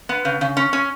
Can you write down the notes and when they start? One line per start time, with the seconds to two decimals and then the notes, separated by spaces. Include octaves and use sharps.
0.09 B3
0.25 C#3
0.41 C#3
0.57 C#4
0.73 C#4